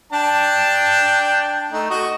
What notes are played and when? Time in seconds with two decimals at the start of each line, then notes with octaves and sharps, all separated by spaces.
0.13 D4 G5 A5
1.72 A3 D#4
1.90 F#4 D#5 C#6